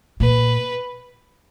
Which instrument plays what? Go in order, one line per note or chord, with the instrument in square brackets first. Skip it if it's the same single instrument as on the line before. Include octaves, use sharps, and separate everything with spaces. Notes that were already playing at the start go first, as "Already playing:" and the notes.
[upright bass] A#2 [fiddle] B4